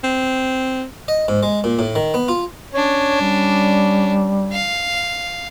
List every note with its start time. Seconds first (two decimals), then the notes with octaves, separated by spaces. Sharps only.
0.04 C4
1.08 D#5
1.28 G#2
1.43 G#3
1.64 A#2
1.79 A2
1.95 D#3
2.14 B3
2.28 F4
2.73 C#4 D4 C#5
3.21 G3
4.52 F5